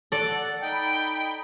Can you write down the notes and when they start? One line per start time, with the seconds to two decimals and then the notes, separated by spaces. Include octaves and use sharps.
0.12 A4 D5 F#5
0.61 D#4 G5 B5